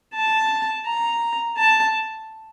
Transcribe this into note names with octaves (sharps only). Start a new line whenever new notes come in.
A5
A#5
A5